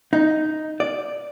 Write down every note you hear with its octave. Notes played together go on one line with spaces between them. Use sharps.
D#4
D5